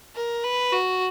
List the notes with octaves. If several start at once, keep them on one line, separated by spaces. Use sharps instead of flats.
A#4
B4
F#4